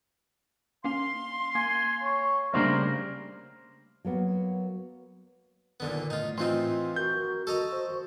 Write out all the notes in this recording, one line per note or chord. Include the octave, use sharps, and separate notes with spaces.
A#3 C#4 F5 C6
A#3 G#5
C#5
C#3 G3 A3 A#3 D4 A#4 C5
F#3 A#3 B3
A#2 D3 D#3 B3
A2 D#4 F4
E3 C4 D#4 F4 C6
F#4 A#4 G6
F#4 A4 D#5 A#5 E6
C5